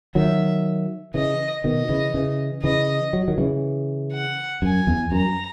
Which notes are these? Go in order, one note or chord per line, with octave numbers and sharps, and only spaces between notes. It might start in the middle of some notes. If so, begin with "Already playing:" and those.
D#3 F#3 E5
C#3 E3 D#5
B2 D#3 D#5
C#3 E3
C#3 E3
C#3 E3 D#5
F#3
D#3 F#3
C#3 E3
F#5
F#2 G#5
E2
F#2 A#5